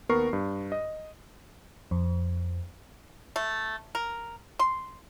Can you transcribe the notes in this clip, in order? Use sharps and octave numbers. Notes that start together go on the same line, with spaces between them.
D#2 B3 A#4 C#6 C7
G2
D#5
F2
A3
A#4
C6